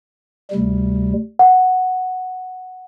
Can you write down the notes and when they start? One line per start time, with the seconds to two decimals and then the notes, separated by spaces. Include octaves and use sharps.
0.51 D2 C3 G3
1.39 F#5